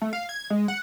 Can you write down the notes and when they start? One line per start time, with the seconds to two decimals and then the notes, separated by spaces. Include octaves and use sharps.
0.02 A3
0.13 F5
0.29 G#6
0.50 G#3
0.68 F#5